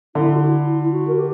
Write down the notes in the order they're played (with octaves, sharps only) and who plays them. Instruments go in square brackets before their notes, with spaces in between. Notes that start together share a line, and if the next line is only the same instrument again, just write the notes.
[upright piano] D3 [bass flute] E4
[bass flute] F#4
E4
E4
F#4
A#4
G4